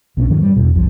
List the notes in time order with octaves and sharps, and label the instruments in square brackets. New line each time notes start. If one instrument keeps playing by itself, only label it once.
[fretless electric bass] B1 B2 C4 C#4
G2 D#3 E3 F#3
G3
E2 B2
F#1 C2 F#2 F3